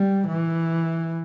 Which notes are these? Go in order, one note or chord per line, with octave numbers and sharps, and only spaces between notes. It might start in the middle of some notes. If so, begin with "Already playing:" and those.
Already playing: G3
E3